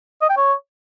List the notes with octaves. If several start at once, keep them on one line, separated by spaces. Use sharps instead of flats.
D#5
G5
C#5